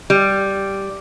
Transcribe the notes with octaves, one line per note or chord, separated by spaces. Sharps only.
G3